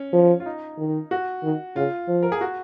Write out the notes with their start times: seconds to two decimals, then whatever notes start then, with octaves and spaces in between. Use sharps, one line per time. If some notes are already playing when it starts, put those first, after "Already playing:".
Already playing: C#4
0.13 F3
0.40 F4
0.46 D#4
0.78 D#3
1.11 F#4
1.44 D#3
1.76 C#3 F4
2.08 F3
2.23 A#4
2.32 G#4
2.41 F#4